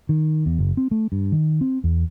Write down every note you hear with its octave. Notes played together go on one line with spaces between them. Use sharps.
D#3
E2
F#1
C4
A3
G2
D#3
C4
E2